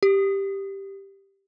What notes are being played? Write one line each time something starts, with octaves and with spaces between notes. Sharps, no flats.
G4